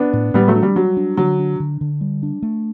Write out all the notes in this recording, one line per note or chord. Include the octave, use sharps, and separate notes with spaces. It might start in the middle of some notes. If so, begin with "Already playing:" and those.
Already playing: B3 D4
A2
A2 G3 B3
F#3 A3
D4
G3
F#3 G3
D4
D3 F#3
D4
D3
D3
G3
D4
A3